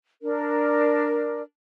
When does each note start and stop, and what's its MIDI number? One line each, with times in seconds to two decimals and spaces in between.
0.22 1.41 62
0.22 1.41 70